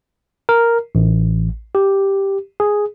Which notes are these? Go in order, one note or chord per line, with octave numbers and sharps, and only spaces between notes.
A#4
A1
G4
G#4